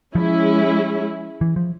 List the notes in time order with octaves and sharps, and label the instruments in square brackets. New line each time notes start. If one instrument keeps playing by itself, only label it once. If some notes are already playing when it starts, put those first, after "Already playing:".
[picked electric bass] F3 [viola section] G#3 C#4 E4
[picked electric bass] E3
F3